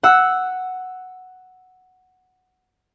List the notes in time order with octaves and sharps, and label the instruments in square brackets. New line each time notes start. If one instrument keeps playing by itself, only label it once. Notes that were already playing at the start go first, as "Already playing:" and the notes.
[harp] F#5 E6